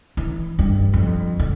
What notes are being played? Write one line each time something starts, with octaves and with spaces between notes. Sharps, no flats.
E3
G2
F2
D3